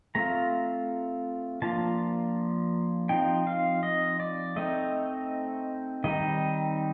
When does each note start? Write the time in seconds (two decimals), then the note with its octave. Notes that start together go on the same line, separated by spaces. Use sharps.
0.15 A3 C4 F4 A#5
1.62 F3 A#3 D4 F4 A5
3.09 F3 C4 D#4 G5
3.47 F5
3.83 D#5
4.20 D5
4.56 A3 C4 D#4 D#5
6.04 D#3 G3 C4 D#4 D#5